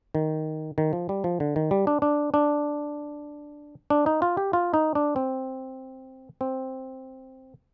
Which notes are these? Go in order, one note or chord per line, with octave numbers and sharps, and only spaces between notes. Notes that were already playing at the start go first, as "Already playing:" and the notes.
D#3
D#3
F3
G3
F3
D3
D#3
G3
D4
D4
D4
D4
D#4
F4
G4
F4
D#4
D4
C4
C4